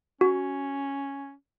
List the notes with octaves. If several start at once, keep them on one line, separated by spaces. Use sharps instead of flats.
C#4 F#4